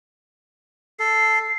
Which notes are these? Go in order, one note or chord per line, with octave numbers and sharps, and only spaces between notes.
A4 C7